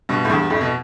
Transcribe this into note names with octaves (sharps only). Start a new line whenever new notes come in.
G2 B2
A2
E2 G2
F2 A2
B2